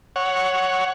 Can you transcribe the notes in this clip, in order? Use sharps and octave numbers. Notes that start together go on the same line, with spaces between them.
C#5 F#5